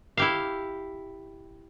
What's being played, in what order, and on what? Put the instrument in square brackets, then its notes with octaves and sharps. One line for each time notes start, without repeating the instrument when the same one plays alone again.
[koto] E4 G4 F5